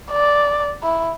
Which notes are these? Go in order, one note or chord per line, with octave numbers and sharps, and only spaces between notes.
D5
E4